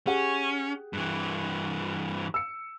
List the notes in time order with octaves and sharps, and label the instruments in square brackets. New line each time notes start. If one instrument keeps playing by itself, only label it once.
[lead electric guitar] C#4 [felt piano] G4 G#4 F#5
[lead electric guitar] G2 E3
[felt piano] E6 C#7